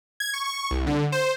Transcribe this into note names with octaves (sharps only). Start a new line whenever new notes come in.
G#6
C#6
C#6
C2
D3
C5